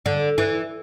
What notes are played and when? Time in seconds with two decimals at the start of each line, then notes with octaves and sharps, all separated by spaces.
0.06 D3
0.38 E3